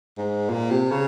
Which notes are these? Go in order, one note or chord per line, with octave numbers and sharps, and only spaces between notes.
G#2
A#2
C3
C#3